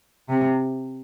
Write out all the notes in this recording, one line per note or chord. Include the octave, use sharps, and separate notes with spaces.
C3